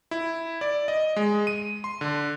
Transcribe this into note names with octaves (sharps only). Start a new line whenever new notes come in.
E4
D5
D#5
G#3
D#7
C6
D3